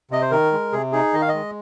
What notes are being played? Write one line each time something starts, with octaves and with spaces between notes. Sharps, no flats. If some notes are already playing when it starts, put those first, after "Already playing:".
C3 D#5
C5
D#3 A#4
G#3
C3 G#4
D#4 G#4
D#3 D#5
F5
D#5
G#3